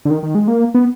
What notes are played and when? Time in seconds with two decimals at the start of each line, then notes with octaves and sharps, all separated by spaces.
0.05 D3
0.10 D#3
0.23 D#3
0.35 G#3
0.48 A#3
0.74 B3